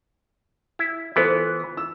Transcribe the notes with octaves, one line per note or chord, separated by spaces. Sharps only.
E4
E3 B3 F4 A4 C5
E6